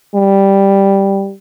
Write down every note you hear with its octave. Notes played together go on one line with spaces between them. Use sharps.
G3